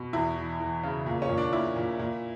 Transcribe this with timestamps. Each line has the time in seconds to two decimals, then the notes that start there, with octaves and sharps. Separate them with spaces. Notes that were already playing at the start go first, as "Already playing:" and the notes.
Already playing: B2
0.13 E2 E4
0.37 E3
0.60 E3
0.83 C#3
1.06 A#2
1.22 C#4
1.29 A#2
1.37 D4
1.52 A#2 E4
1.76 A#2
1.99 A#2